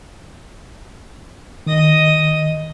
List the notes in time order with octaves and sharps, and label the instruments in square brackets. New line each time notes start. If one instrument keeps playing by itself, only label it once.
[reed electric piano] D#3 [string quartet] D#5 D#6